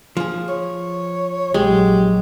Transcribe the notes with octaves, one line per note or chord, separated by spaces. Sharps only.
F3 G#4
C#5
A#1 F#3 G#3 G4